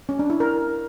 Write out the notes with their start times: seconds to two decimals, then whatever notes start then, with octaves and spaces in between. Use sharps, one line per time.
0.09 C#4
0.19 D4
0.30 E4
0.40 A#4